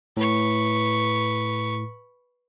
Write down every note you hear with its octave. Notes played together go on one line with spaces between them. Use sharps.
A2 B4 C#6